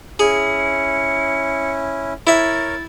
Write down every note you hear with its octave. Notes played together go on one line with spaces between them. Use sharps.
C#4 E4 G#4 C#7
E4 A#4 C#5 E5 A6